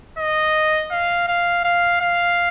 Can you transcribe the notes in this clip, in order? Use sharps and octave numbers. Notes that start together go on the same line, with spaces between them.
D#5
F5
F5
F5
F5